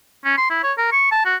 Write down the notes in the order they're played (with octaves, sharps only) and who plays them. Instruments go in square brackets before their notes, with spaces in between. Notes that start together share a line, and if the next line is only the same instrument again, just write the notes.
[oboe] C#4
C6
E4
C#5
A#4
C#6
A5
F#4